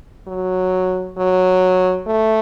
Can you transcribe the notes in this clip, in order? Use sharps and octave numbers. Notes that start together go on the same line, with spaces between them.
F#3
F#3
A3